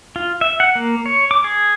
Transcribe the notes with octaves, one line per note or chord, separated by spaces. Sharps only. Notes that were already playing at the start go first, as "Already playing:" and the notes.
F4
E5
F#5
A#3
C#5
D6
G#4